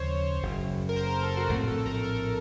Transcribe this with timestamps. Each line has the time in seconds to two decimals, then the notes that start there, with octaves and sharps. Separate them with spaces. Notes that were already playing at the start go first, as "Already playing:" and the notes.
Already playing: D#2 C#3 F3 C5 C#5
0.43 F#1 F#2 C#3
0.89 A#4
0.96 C5
1.10 C5
1.23 A4
1.37 F#4
1.49 A#1 A2 A3 C4 F#4
1.68 A4
1.86 A#4
2.03 A#4